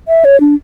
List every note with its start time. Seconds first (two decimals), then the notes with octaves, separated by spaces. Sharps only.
0.08 E5
0.25 C#5
0.40 D4